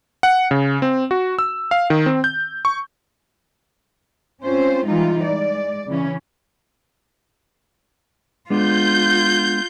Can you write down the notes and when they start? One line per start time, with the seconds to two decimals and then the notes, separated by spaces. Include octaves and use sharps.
0.23 F#5
0.51 C#3
0.82 C4
1.11 F#4
1.39 E6
1.71 F5
1.90 D#3
2.06 C4
2.24 G6
2.65 C#6
4.43 C4 C#4 F4 C5
4.86 E3 G3 G#3 D#4 F4
5.25 G#3 D5
5.88 C#3 E3 C#4
8.50 G#3 B3 D4 F4 G6